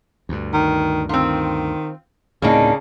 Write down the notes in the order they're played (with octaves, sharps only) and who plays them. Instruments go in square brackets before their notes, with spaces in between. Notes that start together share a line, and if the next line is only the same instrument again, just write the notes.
[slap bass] D2 G2
[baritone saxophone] D#3
[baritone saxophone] D#3 [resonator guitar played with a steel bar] C4 F4
[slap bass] D2 A2 C4 [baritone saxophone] C#3 [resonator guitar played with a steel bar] A#3 D4 D#4